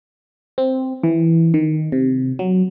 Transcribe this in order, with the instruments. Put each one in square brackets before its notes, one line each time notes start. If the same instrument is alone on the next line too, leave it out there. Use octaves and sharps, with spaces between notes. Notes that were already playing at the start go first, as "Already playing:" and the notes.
[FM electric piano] C4
E3
D#3
C3
F#3